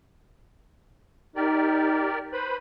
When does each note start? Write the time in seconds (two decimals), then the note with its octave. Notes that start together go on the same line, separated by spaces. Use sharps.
1.36 D#4 G4 A#4 D5
2.33 B4 C5 B5